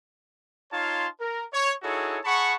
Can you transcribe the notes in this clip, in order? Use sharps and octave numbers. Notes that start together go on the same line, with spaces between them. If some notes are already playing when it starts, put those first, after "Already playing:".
D#4 F4 C#5 F5 A5 C6
A#4
C#5
D#4 E4 F#4 G#4 A4 C#5
G#4 F#5 A5 B5 C#6